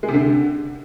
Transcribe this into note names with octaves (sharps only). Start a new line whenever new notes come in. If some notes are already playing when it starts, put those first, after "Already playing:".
G#3
C3
D3